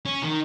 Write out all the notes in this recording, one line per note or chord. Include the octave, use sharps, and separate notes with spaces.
C#4
D#3